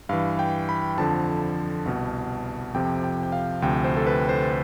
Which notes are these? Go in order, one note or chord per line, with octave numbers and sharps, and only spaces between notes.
G2 E3 F5
G5
B5
F2 D3 F3 A5
C2 B2
F2 C3 F3 G5
G5
G5
F5
D2 C3 F3 G5
C5
A4
B4
C5